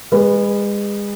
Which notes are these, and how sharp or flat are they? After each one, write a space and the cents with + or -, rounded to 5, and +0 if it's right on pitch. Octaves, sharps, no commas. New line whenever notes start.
G#3 -30 B4 +0